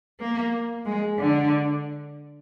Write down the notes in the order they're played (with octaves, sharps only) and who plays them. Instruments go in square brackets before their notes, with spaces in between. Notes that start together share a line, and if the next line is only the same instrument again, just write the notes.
[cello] A#3
G#3
D3